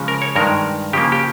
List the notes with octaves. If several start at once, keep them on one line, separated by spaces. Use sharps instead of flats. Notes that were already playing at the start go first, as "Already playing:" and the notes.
Already playing: C#3 F3 G#3 C#4
A#4
C#5
G2 D#3 G#3 A#4
C#3 F3 A#3 G4
G4